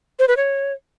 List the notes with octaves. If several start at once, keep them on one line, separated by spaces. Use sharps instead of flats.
C5
B4
C#5